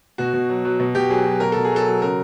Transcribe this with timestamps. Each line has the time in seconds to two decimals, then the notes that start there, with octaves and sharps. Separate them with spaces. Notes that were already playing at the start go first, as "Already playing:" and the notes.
0.18 B2 F#4
0.33 B2
0.49 F#3
0.65 F#3
0.80 B2
0.95 B2 G4
1.10 F#3 G#4
1.25 F#3
1.40 B2 A#4
1.52 B2 A4
1.64 G#4
1.71 F#3
1.76 A4
1.86 F#3
2.01 C#3 A#4